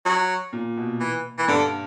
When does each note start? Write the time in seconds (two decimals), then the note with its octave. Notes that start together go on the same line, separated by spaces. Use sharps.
0.06 F#3
0.53 A#2
0.77 B2
1.00 E3
1.38 E3
1.48 G2 D3